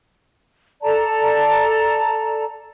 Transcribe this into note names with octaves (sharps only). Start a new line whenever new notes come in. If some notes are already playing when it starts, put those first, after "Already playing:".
A4 D5 A5 A#5